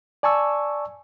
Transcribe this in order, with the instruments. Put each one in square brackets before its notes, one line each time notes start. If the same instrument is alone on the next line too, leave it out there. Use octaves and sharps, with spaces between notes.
[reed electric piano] D5 G#5 A5 C#6 E6